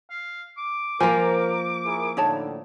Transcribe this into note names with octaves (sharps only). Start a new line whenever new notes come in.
F5
D6
F3 A#3 A#4 G#5
E4 G#4 A#4
A2 D3 D#4 C#5 A5